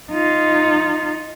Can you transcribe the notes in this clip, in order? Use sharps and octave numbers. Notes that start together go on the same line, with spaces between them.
D#4 F4